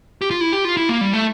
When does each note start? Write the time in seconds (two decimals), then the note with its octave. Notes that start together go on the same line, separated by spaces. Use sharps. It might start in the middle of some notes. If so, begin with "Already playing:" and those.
0.21 G4
0.31 F4
0.41 E4
0.53 G4
0.65 F4
0.77 E4
0.89 A#3
1.01 G3
1.13 A3